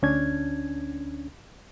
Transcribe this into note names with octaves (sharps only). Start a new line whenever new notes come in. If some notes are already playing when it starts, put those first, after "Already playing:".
D2 C#4 D4 G#6